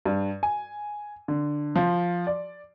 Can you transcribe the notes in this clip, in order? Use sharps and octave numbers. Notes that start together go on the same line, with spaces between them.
G2
G#5
D3
F3
D5